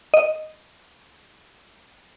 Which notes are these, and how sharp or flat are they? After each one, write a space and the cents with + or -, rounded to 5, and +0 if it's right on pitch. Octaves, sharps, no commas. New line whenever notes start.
D#5 -5